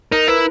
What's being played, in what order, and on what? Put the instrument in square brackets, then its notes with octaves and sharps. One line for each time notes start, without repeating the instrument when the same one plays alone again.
[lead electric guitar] D#4 [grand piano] A#4
[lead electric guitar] E4 [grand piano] B4